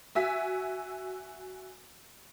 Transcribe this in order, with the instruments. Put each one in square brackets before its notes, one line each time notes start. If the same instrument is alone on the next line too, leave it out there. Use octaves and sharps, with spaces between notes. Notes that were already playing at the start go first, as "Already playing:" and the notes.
[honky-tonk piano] F#4 E5 G#5 E6 B6